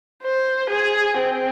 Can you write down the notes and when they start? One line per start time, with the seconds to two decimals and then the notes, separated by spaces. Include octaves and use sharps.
0.23 C5
0.70 G#4
1.17 C4